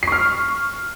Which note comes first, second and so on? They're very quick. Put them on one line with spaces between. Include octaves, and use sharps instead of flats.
C7 C#6 F6